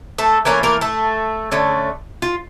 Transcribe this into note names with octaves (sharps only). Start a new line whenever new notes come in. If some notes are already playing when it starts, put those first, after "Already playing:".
A3 A4
E3 A3 A#3 C#4 A#4
A#3 A#4
A3 A4
D3 A3 C#4
F4